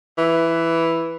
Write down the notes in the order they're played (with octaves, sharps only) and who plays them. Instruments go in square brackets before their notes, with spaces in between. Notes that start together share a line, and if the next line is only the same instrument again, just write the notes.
[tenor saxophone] E3